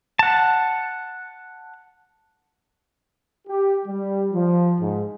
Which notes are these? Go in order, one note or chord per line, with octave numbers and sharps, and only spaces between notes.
F#5 A5
G4
G3
F3
G#2